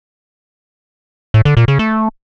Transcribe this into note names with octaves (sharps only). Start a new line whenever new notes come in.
A2
D3
A#2
C#3
A3